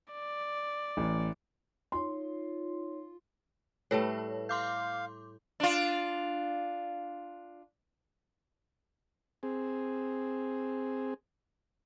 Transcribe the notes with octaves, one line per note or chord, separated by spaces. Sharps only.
D5
A1
D#4 F4 C#5 C6
A2 G3 A3 B4 C#5
F5 C6 D6 G6
D4 F4
C4 G#4